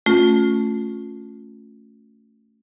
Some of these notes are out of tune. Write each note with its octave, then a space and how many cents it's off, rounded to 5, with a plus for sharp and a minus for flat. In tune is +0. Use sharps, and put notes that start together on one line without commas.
A3 +0 C#4 +0 F4 +30